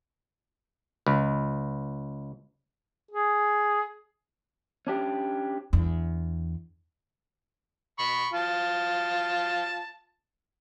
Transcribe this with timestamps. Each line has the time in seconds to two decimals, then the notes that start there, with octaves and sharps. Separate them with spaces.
1.07 C#2
3.11 G#4
4.87 C#4 D4 G4
5.73 E2 D4
7.99 B5 C#6
8.33 F4 A5